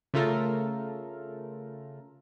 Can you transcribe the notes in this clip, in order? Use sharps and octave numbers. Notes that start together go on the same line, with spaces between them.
C#3 A3 F4 A4 A#4